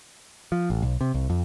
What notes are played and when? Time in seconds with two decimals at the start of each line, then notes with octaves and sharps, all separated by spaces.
0.52 F3
0.70 A1
0.82 B1
1.01 C3
1.14 C2
1.30 F2